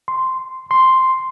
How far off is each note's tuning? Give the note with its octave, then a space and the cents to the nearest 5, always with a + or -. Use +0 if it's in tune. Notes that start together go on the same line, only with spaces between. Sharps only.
C6 -5
C6 +0